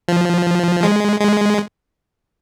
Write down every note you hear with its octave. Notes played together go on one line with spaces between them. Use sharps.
F3
G#3
G#3